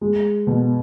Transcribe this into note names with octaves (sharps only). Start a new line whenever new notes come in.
G#3
B2